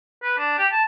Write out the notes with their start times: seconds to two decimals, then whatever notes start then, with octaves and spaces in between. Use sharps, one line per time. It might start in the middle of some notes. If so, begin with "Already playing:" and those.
0.23 B4
0.38 D4
0.58 G4
0.72 A5